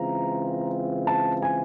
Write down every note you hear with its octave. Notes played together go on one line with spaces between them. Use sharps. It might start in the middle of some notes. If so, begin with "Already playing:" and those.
Already playing: C#3 E3 G#3 C4 F4 A#5
A5
G#5